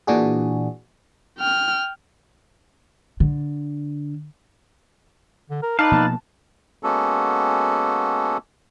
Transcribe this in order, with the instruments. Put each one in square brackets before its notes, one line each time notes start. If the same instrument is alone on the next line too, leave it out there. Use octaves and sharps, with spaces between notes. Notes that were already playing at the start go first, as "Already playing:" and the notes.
[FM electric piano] A#2 E3 D4 F#4 G#4
[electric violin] G5 F6
[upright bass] D3
[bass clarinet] D3
A#4
[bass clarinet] D#4 [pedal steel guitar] B4 D5 F5 [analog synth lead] A5
[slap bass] B2 F3 A#3
[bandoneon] G#3 A#3 B3 C#4 F#4 A4